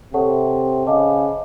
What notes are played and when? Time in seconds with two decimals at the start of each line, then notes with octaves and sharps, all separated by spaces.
0.14 C3 A4 C#5 F#5 A5 C#6
0.87 C#3 C5 D#5 F#5 A5 D6